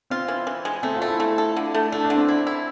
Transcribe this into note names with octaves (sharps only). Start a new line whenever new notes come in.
C4 F4
E3
E3
G#3
A3 C4
F4
A3
E4
A3
A4
D3
A3
A3 D4
D4
D3
C4
E4
E4